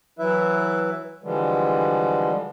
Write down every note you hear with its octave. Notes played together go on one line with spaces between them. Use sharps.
E3 F#3 E4 B4 E5
D3 E3 F3 G3 G#3